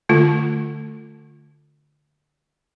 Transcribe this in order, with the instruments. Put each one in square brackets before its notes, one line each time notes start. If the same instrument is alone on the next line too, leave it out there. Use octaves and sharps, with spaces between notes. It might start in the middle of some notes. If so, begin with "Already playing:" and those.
[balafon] D3 A3 F4